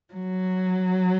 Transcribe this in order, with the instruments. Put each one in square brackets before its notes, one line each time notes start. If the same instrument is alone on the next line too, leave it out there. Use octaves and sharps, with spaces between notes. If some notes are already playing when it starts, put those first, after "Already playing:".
[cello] F#3